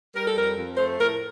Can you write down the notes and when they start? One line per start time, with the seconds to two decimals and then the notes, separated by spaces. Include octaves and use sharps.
0.15 G3 A#4
0.26 A4
0.36 F2 A#4
0.57 F2
0.78 A3 C5
0.98 A2 A#4